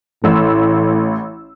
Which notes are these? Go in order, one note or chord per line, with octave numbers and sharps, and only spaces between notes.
A1 A2 E6